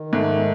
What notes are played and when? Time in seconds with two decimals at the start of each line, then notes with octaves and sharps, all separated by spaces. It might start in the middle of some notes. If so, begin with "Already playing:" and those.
Already playing: D#3
0.13 G#2 G#3 A3